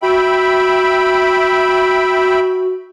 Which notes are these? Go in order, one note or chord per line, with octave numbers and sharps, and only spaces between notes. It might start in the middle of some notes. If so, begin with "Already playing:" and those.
F#4 E5 G5 B5